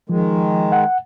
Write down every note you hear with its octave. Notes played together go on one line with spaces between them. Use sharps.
D#3 F3 G#3
F#5